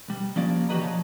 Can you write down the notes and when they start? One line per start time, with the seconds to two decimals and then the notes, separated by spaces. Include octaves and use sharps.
0.08 B1 G3
0.36 F3 G3 A#3 C#4 D5 F5
0.69 E3 F#4 G4 B4 D#5 A#5
0.81 B1 F3 C#5 D#5 A5